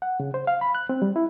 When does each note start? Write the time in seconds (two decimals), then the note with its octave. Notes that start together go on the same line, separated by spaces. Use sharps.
0.02 F#5
0.20 C#3
0.34 C5
0.47 F5
0.61 B5
0.75 F#6
0.89 C4
1.02 G3
1.16 E4